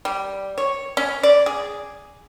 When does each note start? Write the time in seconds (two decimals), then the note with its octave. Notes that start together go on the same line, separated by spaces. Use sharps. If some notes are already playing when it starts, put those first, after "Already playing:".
0.05 G3
0.58 C#5
0.97 C#4
1.23 D5
1.46 G#4